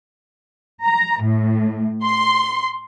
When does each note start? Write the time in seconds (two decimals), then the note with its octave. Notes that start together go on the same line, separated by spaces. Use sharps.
0.84 A#5
1.22 A2
2.03 C6